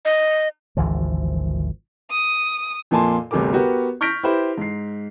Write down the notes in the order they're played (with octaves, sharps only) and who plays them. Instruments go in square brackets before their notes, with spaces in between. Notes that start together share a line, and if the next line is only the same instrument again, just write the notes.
[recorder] D#5
[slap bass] G#1 D2 E3 F3
[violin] D#6
[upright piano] F2 A#2 A#3 G#5 A5 C6
G1 D2 C3 G#4 A#4 D6
B3 F#4 G4 A#4
C#6 F6 G6 A#6 B6 D7
E4 G4 B4 C5
G#2 C7